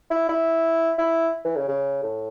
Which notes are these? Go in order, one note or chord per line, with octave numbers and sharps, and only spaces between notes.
E4
E4
E4
E3
C#3
C#3
A2